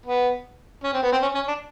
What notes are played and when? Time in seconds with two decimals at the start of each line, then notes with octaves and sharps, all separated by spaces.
0.06 B3
0.83 C#4
0.93 C4
1.03 B3
1.12 C4
1.22 C#4
1.35 C#4
1.48 D4